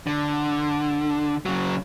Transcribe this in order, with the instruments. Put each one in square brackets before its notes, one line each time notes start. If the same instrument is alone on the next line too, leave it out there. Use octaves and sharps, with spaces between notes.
[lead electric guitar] D3
C#3 F#3